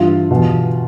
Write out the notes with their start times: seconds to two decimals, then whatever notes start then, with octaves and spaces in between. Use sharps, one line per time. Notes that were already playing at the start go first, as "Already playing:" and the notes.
Already playing: G2 E3 F4
0.31 E2 B2